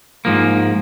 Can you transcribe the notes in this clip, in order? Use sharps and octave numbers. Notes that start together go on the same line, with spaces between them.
G#2 F3 A#3